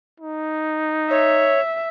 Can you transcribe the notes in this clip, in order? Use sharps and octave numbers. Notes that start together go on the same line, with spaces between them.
D#4
C#5 E5